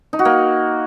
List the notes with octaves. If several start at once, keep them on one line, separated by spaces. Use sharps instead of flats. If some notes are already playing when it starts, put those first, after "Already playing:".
D#4
F#4
A#3